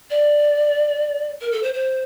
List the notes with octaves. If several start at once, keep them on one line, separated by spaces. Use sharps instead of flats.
D5
A#4
A4
C5
C5